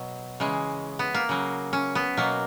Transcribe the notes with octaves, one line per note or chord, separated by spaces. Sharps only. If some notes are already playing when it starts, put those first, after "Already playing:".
Already playing: B2 F#3
C#3 E3 G#3
B3
A#3
C#3 F#3
C#4
B3
B2 F#3 A#3